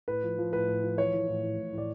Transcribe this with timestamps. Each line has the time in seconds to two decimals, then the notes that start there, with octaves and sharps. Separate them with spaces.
0.08 A2 B4
0.23 F3
0.38 F3
0.53 A2 B4
0.68 A2
0.83 F3
0.98 E3 C#5
1.13 E3
1.28 A2
1.43 A2
1.58 A2
1.73 A2 D5